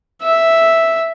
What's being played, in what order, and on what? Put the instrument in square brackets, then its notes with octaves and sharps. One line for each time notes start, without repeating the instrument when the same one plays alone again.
[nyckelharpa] E5